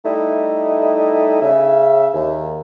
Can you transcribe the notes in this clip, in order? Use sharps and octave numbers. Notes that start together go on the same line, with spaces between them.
G3 A3 D#4 E4 D#5
C#3 E5
D#2